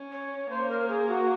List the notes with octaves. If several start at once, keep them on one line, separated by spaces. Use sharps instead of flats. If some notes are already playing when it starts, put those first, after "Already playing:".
Already playing: C#4
C#5
A#3 C5
A#4
G#4
F#4